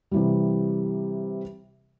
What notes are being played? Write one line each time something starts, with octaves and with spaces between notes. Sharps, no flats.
C3 E3 G3